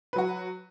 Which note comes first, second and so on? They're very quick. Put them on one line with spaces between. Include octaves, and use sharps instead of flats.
B4 F#3 F#4